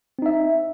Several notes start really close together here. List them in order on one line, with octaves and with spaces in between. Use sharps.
C4 D#4 E5